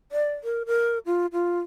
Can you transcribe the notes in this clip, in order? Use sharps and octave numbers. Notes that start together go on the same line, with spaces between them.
D5
A#4
A#4
F4
F4